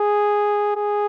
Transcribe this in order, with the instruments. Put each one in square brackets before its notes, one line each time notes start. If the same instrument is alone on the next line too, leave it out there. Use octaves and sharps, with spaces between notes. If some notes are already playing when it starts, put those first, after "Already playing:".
Already playing: [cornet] G#4
G#4